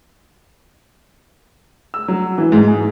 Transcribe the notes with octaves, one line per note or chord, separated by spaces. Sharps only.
E6
F#3
E3
G#2
G#4